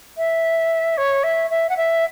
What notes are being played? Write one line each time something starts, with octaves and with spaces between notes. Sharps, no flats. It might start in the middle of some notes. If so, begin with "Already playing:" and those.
E5
C#5
E5
E5
F#5
E5